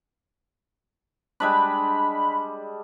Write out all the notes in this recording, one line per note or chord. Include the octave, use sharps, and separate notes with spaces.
G3 G#3 D4 B5